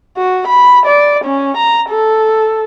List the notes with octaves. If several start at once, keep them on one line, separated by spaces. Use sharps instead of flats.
F#4
B5
D5
C#4
A#5
A4